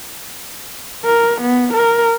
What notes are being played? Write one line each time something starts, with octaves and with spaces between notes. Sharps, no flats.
A#4
B3
A#4